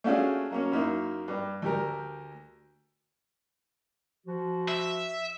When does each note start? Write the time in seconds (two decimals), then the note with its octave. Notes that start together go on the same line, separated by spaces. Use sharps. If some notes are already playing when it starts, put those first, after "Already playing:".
0.04 A3 C#4 D4 F4 F#4 G#4
0.50 F#3 A#3 C#4
0.72 F#2 A#3 D#4 E4
1.28 G2
1.62 D2 G4 A#4
4.27 F3 F#4
4.68 E5